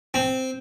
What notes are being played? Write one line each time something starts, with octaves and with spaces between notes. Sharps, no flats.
C4